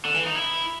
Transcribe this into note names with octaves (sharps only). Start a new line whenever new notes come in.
D3
E3
D#4
E4